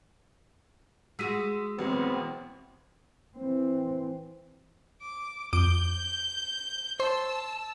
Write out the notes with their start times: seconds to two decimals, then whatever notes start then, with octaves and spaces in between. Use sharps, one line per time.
1.19 G#3 F#4 E6 B6 D#7
1.79 A1 B2 F#3 B3 C4
3.37 E3 C4
5.01 D6
5.53 F2 D6 G6 D7
7.00 C5 A5 C6 E6